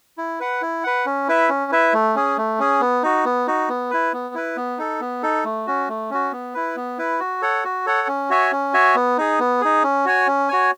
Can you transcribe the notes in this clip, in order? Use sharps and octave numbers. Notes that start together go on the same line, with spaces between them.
E4
B4 F#5
E4
B4 F#5
C#4
E4 B4 E5
C#4
E4 B4 E5
A3
C#4 G#4
A3
C#4 G#4
B3
D#4 F#4
B3
D#4 F#4
B3
E4 B4
B3
E4 B4
B3
D#4 A4
B3
D#4 A4
A3
C#4 F#4
A3
C#4 F#4
B3
E4 B4
B3
E4 B4
F#4
A4 C#5 F#5
F#4
A4 C#5 F#5
C#4
F#4 C#5 E5 G#5
C#4
F#4 C#5 E5 G#5
B3
D#4 G#4
B3
D#4 G#4
C#4
F#4 C#5 G#5
C#4
F#4 C#5 G#5